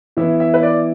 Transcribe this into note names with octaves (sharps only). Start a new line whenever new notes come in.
E3 B3 E4 E5
E5
B4
D5